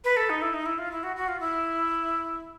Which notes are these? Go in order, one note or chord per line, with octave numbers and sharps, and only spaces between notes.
B4
A4
D#4
E4
D#4
E4
F4
E4
F#4
F#4
F4
E4